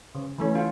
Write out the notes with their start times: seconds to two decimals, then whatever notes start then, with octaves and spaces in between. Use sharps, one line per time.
0.15 C#3
0.38 E3 A3 C#4
0.55 F4